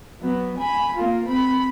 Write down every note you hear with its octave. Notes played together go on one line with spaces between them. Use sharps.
F#3 B3
G#5 B5
A#3 F4
C4 B5